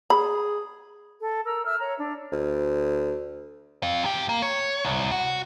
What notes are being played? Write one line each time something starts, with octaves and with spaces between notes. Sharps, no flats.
G#4 B5
A4
A#4 A#5 E6
E5 E6 F6
C#5 A#5
D4
D2
C4 F5
E2 G4
A#3
C#5
C2
F#4